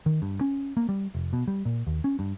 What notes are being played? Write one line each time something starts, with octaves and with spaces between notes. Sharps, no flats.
D#3
G2
C#4
A#3
G3
F1
B2
G3
A#2
D#2
C#4
G2